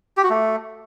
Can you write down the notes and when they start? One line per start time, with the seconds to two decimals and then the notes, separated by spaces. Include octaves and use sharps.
0.17 G4
0.23 F#4
0.30 A3